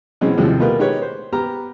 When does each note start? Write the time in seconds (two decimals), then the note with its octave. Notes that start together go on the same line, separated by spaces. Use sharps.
0.21 B2 E3 F#3 G#3 C4 C#4
0.37 D#2 A2 C3 F3 G3 G#3
0.60 B2 A3 F4 G4 A#4 B4
0.79 G#3 D#4 G4 B4 C#5
1.02 C5
1.33 B3 G4 A#5 F6